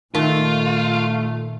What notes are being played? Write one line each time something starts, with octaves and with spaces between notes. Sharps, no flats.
A#2 D#3 A3 F4